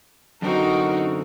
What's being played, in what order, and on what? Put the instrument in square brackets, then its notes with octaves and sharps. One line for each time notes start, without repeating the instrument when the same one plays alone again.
[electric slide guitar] F#2 D3 C4 [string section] D#4 F#4 A#4